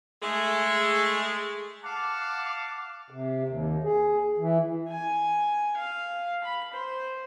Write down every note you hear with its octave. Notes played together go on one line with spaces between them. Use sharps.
G#3 A3
F5 F#5 A5 D6
C3
D#2
G#4
E3
G#5
F5
B5
C5